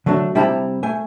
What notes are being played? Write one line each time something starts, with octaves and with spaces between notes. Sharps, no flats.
D3 F#3 A3 D4
C3 G3 D4 E4 A5 A#5
A3 G#5